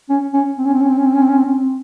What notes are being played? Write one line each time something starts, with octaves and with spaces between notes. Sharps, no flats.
C#4
C#4
C4
C#4
C4
C#4
C4
C#4
C4
C#4
C4
C#4
C4
C#4
C4